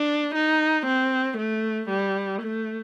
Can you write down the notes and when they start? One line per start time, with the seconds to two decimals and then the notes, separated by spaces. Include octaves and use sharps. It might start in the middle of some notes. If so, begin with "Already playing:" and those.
Already playing: D4
0.35 D#4
0.86 C4
1.37 A3
1.89 G3
2.41 A3